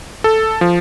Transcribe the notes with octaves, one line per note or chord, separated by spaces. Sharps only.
A4
F3